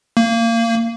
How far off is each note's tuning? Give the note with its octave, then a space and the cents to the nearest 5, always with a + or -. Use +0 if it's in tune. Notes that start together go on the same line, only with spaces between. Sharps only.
A#3 -25